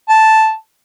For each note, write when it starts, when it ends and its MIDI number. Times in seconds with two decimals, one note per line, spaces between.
0.09 0.54 81